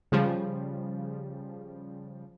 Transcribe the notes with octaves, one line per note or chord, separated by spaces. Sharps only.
C#3 F3 G3